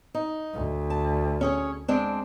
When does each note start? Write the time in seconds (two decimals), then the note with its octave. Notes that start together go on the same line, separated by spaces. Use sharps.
0.14 D#4
0.54 D2
0.90 A5
1.41 C#4 G#4 C#5
1.88 G#3 C4 D4